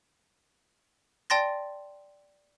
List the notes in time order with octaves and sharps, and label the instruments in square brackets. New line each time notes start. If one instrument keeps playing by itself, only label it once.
[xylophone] D5 G5 A5 C6 A6 A#6